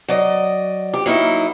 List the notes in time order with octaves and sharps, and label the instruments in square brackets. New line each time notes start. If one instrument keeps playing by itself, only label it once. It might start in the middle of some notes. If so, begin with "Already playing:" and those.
[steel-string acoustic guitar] F#3 D5 D#5
G4
F#3 A#3 D#4 E4